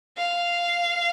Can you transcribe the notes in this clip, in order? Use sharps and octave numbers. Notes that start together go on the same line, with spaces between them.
F5